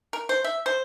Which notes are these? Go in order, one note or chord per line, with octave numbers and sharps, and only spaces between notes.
A#4
C5
E5
C5